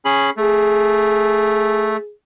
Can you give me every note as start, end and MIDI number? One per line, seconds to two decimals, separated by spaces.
0.05 0.30 61
0.05 0.30 68
0.05 0.30 83
0.37 1.97 57
0.37 2.12 68